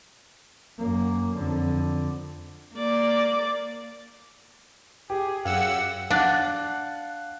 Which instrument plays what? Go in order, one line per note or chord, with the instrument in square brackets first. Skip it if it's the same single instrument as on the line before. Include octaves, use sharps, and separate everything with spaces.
[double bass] F#2 A#3
F2 D3
[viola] A#3 D5
[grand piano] G4 [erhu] G#4
[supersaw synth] F#2 E6 [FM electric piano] G#4 F5 [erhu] F#5
[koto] D4 [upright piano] F5 F#5 F#6